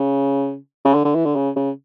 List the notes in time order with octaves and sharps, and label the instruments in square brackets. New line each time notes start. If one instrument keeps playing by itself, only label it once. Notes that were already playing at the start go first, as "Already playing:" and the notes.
Already playing: [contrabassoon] C#3
C#3
D3
D3
E3
D3
C#3
C#3